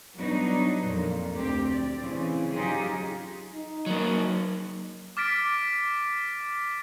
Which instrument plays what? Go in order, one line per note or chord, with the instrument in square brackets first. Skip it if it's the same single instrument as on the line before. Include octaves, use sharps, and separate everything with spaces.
[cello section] F#3 G3 B3 D4 D#4
F2 A#2
D2 C4 G4
D5
C#3 E3 C4
F#3 D#4 F4 G4 G#4
[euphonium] D#4
[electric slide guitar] F#3 A#3
[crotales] D6 F6 A6 B6 D7